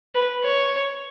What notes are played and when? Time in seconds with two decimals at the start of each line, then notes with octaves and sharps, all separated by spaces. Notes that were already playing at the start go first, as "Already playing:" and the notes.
0.15 B4
0.43 C#5